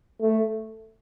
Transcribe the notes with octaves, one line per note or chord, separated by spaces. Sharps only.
A3